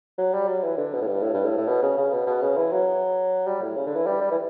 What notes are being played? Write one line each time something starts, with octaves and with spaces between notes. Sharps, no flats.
F#3
G3
F#3
E3
D3
B2
A2
G2
A2
G2
A2
A2
B2
C#3
C#3
B2
B2
C#3
E3
F#3
G3
A2
C#3
D3
E3
G3
G3
E3